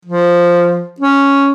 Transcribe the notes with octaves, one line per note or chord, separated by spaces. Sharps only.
F3
C#4